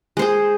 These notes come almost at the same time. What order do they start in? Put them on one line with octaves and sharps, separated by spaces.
G#3 C5 G#4